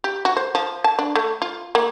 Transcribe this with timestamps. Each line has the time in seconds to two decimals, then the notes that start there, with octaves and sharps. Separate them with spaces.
0.04 G4
0.25 F#4
0.37 C5
0.55 F3
0.84 A5
0.99 D4
1.15 A3
1.42 F4
1.75 A#3